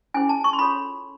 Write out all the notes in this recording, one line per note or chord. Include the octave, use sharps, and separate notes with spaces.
C#4 E4 G#4 C5 G#5
A5
C#6
C6
F4 A4 C#5 B5